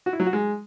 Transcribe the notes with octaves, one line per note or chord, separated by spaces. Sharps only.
F#4
E4
F#3
F#4
G#3